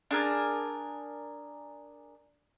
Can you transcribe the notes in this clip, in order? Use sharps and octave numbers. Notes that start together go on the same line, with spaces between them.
D4 G#4 A#4 A5